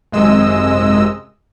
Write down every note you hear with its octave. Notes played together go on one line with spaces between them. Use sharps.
G#1 F#2 C3 G#3 D#5 E6